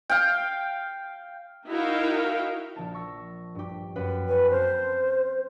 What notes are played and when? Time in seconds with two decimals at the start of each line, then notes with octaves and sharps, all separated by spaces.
0.10 F5 G5
1.69 D#4 E4 F#4 A#4 F5 G5
2.76 A#1 A5
2.94 C#6 E6 A#6
3.55 G2 G4
3.96 F#2 B4 G5
4.29 B4 C#5 G#5
4.51 C4 C5 A5 F6